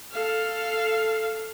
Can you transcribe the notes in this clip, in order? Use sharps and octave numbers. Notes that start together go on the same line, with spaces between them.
A4 F5